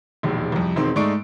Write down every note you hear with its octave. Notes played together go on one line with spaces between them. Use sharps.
E1 A#1 D#2
C2 F2
E1 D#3 C4 C6
G#2 G#3 A3 D5 C#6 D7